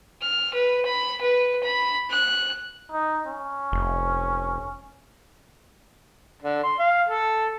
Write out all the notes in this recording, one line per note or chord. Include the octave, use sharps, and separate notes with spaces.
F6
B4
B5
B4
B5
F#6
D#4
C#4
F1
D3
C6
F5
A4